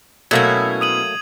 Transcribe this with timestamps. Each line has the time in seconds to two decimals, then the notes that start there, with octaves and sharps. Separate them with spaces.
0.31 B2 F#3 A3 A#3 C#4 E4 G#6
0.81 D#6 D#7 F#7